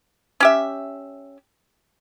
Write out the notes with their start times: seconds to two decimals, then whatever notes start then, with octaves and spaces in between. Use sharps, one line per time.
0.40 C#4 G4 E5